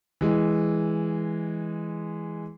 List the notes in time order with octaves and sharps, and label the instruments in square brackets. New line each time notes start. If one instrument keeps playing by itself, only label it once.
[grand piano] E3 G#3